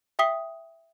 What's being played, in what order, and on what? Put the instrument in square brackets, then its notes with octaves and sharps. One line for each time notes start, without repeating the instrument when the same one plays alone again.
[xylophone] E5 G5 D#6 B6 G7